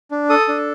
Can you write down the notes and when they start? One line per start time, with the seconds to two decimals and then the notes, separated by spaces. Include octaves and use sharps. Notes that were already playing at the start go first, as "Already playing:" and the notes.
0.11 D4
0.30 A4 D#6
0.48 D4